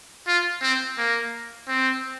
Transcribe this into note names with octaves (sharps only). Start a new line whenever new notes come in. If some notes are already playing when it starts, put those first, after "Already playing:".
F4
C4
A#3
C4